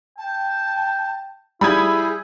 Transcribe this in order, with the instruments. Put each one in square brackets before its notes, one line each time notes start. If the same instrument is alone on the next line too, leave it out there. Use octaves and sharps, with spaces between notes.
[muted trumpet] G5 [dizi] A5
[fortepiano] G3 [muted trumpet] E4 [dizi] G#4 [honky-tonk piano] B5 D#6 G#6